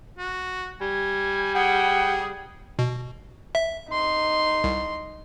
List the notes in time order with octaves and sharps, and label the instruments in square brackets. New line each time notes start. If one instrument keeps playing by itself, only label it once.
[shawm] F#4
[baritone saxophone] G3 [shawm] G#5
[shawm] G#4 [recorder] F#5 [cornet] G5
[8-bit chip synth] B2
E5
[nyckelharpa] D#4 C6
[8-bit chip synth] C2